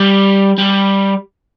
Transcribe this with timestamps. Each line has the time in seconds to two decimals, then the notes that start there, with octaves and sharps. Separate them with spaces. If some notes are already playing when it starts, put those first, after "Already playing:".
Already playing: G3
0.58 G3